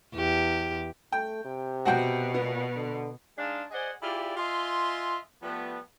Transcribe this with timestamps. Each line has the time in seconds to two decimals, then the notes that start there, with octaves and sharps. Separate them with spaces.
0.15 E2 G4
1.12 A3 G5
1.45 C3
1.85 B2 F#4 F#5 G5
2.34 A#2 B3
2.76 D3
3.37 G#3 D4 D#4 F5 A5 C6
3.71 G#4 C5 D5 D#5 F#5 G#5
4.01 E4 F4 G4 G#4 D5
4.37 F4 D#5 E5 G#5 C6
5.42 F3 G3 A3 B3